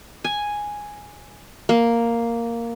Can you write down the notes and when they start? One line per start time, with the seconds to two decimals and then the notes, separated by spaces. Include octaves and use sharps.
0.25 G#5
1.69 A#3